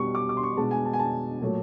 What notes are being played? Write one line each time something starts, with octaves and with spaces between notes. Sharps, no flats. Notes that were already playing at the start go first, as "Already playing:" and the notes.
Already playing: B2 G3 C#6
D6
D6
C6
C#6
B2 G#3 A5
G#5
A5
G#5
A5
A#2 F#3 A3